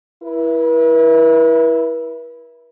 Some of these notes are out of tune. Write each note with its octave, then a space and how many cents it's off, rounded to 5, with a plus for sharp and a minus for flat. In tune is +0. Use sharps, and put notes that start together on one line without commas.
E4 +5 B4 -40